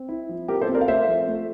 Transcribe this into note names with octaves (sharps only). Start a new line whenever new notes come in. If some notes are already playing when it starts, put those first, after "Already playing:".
Already playing: C4
E4
F3
C4 G4 A#4
A4 C5
C4
A#4 D5
F5
A3 C5 E5
F3
A3